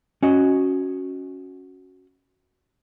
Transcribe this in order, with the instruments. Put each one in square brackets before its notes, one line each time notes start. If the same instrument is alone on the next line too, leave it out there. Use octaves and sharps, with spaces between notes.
[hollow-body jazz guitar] C#4 F#4 D#5